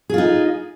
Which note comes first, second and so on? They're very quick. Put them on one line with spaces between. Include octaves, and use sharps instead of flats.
G#4 F4 D#4